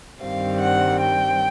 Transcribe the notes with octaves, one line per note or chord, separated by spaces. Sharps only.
G2 D#3 G3 C4 F5
F#5
G5